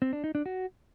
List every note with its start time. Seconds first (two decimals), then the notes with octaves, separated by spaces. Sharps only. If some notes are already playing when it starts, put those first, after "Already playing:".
0.02 C4
0.13 D4
0.24 D#4
0.35 D4
0.46 F#4